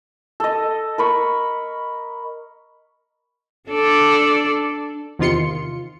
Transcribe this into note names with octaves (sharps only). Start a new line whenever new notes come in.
A4 D#5
A#4 B5 C#6
D4 A4 D5
E2 C3 D#3 F4 C6 C#7